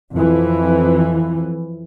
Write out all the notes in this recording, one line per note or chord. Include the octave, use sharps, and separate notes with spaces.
F2 E3